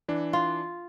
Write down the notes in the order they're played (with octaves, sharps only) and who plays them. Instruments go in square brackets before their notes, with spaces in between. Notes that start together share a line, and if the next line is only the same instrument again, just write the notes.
[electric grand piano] E3 D4
[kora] F4